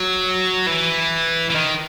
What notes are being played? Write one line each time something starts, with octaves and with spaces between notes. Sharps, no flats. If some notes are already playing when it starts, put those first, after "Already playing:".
Already playing: F#3
E3
E3
D#3